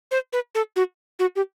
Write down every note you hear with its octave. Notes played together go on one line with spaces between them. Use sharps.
C5
B4
A4
F#4
F#4
G4